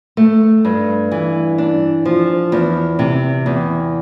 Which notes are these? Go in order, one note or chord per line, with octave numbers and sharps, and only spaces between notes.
A3
G2
E3
D4
F3
E2
C3
E2